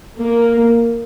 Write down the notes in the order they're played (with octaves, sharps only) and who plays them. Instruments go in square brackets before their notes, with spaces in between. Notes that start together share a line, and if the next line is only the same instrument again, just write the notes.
[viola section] A#3